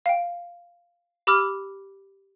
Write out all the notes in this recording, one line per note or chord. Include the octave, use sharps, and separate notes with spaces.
F5 G5
G4 B5 D6 E6 F6